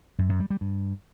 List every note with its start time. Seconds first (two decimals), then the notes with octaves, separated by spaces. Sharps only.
0.19 F#2
0.29 F#2
0.40 G3
0.50 G3
0.61 G2